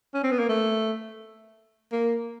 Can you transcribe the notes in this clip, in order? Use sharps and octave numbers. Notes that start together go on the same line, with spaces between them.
C#4
C4
B3
A#3
A3
A#3